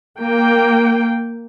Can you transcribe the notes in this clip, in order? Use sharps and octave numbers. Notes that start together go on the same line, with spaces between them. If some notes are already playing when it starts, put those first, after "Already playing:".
A#3 G5